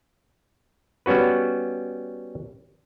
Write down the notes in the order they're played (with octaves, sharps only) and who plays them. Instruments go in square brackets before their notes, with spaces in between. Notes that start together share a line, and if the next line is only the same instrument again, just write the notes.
[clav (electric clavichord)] G3 B3 C#4 F#4 B4